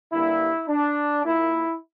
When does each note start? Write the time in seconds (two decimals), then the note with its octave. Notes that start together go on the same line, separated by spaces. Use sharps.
0.11 G2 D3 G3 A#3 E4
0.68 D4
1.24 A#2 A#3 E4